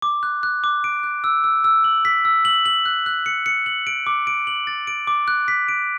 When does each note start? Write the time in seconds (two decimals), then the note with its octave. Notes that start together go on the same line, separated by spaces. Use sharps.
0.02 D6
0.23 F#6
0.43 F#6
0.64 D6
0.84 D7
1.03 F#6
1.24 E6
1.44 E6
1.64 E6
1.84 F#7
2.05 B6
2.25 E6
2.45 F#7
2.66 F#7
2.86 F#6
3.06 F#6
3.26 C#7
3.46 C#7
3.66 F#7
3.87 D7
4.07 D6
4.27 D7
4.47 F#7
4.67 A6
4.87 D7
5.07 D6
5.28 F#6
5.48 B6
5.69 D7